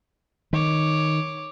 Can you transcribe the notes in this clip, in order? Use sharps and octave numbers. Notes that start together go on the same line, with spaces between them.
D#3 C#5 D6